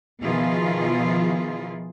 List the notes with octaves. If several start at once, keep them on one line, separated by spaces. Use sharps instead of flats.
B2 D#3 F3 E4 F4 G#4